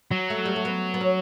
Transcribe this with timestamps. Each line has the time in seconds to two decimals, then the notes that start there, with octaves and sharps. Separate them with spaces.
0.11 F#3
0.30 A3
0.45 G3
0.56 A3
0.65 B3
0.94 B3
1.01 C#4